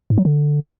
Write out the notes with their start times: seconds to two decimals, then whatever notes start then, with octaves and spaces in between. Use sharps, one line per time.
0.10 G#2
0.18 F#3
0.25 D3